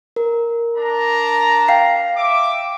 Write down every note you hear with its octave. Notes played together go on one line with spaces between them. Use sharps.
A#4
D4 A#5
F5 G5 C7
E5 D6